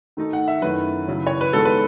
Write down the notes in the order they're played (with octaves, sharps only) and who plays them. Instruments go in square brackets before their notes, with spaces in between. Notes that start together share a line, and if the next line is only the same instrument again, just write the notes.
[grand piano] D#3 A3 D#4
F#5
E5
F#2 D#3 A3 C#4 E4 B4
C#3 F#3 C#4 E4
C#5
B4
D#3 G#3 B3 A4
B4